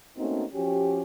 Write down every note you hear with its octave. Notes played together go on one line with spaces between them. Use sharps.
A3 A#3 C4 C#4 D#4 F#4
F3 C#4 F#4 G4